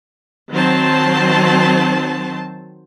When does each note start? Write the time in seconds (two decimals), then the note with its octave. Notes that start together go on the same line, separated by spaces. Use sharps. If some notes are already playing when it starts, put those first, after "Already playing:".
0.52 D#3 F#3 C4 C5 A5